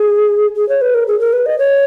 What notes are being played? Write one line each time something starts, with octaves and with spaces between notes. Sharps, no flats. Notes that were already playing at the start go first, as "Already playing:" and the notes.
Already playing: G#4
G#4
C#5
B4
A#4
G#4
A#4
B4
D#5
C#5